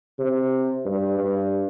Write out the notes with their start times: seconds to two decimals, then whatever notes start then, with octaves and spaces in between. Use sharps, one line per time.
0.19 C3
0.85 G2
1.18 G2